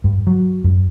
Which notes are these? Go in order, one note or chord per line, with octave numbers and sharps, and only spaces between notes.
G2
F#3
F#2